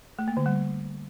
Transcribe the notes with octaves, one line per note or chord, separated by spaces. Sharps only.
A3
A#3
D3
G3